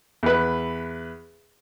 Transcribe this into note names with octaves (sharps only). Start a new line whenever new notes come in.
E2 B4